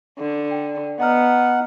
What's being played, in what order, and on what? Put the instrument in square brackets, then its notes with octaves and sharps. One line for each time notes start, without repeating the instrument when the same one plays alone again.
[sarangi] D3
[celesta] G5
[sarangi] B3 [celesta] D#5 A#5 F6 [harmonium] F#5